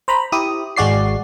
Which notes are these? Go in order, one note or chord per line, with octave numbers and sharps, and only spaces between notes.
C5 A#5 B5
E4 G4 D#6
G#1 G#3 F#4 D5 C7